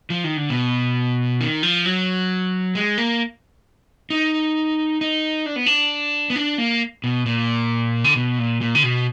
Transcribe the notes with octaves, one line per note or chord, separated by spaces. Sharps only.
F3
D#3
D3
B2
D#3
F3
F#3
G#3
A#3
D#4
D#4
D4
B3
D4
B3
D4
A#3
B2
A#2
D3
B2
A#2
A#2
D3
B2